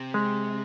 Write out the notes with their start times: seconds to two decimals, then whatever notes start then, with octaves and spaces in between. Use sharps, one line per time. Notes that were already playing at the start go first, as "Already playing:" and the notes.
Already playing: C3
0.14 G#3